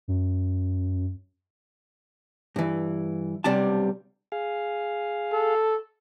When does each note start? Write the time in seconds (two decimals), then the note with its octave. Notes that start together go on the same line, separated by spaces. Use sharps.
0.08 F#2
2.56 G2 E3
3.44 B1 C3 G3 D4 A5
4.32 G#4 F5
5.33 A4